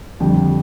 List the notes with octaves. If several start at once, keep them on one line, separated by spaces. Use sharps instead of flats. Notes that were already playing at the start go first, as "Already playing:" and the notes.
F2 D3 G3 G5